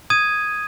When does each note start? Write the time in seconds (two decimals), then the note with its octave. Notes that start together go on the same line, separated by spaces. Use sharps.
0.10 D#6 G#6 D#7